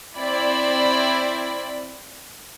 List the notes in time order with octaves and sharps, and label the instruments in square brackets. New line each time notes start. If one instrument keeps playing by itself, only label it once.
[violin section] C4 E4 D5 B5